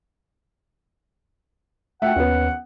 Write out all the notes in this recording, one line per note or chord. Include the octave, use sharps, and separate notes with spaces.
A3 E5 F#5 G5
D#2 B3 C#4